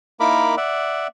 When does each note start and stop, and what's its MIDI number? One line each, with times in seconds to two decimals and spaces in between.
0.20 0.55 58
0.20 0.55 63
0.20 0.55 64
0.20 0.55 70
0.20 0.55 83
0.20 0.55 86
0.57 1.07 74
0.57 1.07 76
0.57 1.07 78